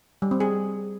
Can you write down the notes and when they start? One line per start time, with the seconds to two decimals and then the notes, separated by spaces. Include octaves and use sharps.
0.22 G3
0.31 C4
0.40 G#4